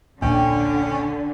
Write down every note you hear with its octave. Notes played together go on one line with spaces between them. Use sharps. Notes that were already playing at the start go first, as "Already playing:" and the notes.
D#1 B1 A#2 D3 C#4 G5 G#5